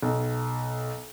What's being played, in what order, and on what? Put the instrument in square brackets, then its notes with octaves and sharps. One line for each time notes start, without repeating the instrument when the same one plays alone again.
[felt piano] B1